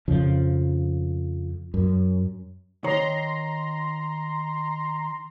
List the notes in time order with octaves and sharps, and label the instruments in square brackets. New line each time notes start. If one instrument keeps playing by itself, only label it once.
[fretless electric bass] F2 C#3 F3
F#2
[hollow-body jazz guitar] D#3 C#5 [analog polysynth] A#5 C6